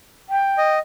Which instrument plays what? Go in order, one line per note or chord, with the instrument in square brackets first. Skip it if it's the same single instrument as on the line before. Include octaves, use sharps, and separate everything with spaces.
[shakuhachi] G5
[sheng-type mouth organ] D#5